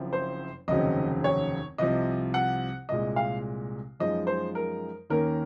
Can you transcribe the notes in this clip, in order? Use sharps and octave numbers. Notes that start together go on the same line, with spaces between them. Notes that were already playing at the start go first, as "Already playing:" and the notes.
Already playing: F#1 F#2 F3 C4
C5
F1 D#2 C#3 F#3 C4 D#5
C#5
C2 C3 F3 D#5
F#5
C2 A#2 G#3 D#5
F5
F#2 F3 G#3 D#4 D#5
C5
A#4
D#2 D#3 A#3 C#4 A#4